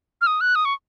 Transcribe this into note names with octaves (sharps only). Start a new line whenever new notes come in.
F6
D#6
F#6
D#6
C#6